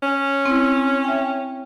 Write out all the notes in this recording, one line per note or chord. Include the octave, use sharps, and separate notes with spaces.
C#4
C4 E4
E5 G5